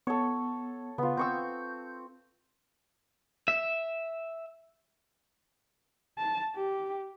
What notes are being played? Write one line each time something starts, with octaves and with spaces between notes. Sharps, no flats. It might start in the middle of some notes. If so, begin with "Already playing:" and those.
B3 A4 C#5
C#3 B3 F4
C4 C#6 E6 G6
E5
A5
G4